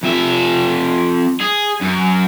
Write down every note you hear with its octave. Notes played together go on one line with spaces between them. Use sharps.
F2 E5
G#4
F#2